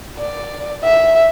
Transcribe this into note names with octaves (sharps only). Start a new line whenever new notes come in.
D5
E5